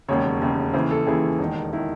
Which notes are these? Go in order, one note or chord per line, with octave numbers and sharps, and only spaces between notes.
E1 D#2 C#3 C#5
E1 D#2 C#3
D#2 C#3 E3 C5
A4
D#2 C#3 E3 G#4
E1 D#2 D#3
D#3 E4